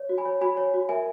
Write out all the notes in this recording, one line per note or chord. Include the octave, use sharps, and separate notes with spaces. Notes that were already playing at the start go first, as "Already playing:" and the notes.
Already playing: C#5
F#4
G#5 B5
C#5
F#4 G#5 B5
C#5
F#4
A#4 E5 G#5